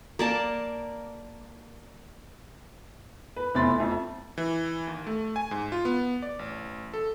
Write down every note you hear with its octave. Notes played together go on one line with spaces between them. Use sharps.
A#3 D5 A5
B4
F1 E2 C3 B5 C6 A6
F2 A3
E3
D#2
A3
G#5
G#2
F4
B3
D5
A1
A4